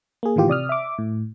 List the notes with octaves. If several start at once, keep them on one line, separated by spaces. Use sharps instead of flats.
A#3 G#4
A2 D#3 E3 F4 G4
C3 D5 D#6 F6
E5 D6
A2